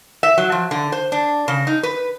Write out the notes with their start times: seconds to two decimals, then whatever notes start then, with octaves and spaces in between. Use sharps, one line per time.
0.23 E5
0.38 F#3
0.52 F3
0.71 D3
0.92 C5
1.12 D4
1.48 C#3
1.67 D#4
1.83 B4